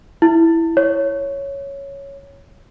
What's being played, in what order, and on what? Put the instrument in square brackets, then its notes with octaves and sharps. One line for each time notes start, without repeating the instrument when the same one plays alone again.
[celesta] E4
C#5